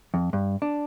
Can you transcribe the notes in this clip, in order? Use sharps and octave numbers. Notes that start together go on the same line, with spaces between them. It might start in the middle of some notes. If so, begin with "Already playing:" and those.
F2
G2
D4